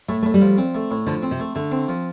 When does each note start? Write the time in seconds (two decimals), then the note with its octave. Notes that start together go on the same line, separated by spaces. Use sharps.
0.09 A2 A3
0.22 A2 A3
0.34 G3
0.41 F3
0.58 C4
0.75 A3
0.91 A2
1.07 D3 F3
1.23 C4
1.31 C3
1.40 A3
1.55 D3 A3
1.72 C4
1.88 F3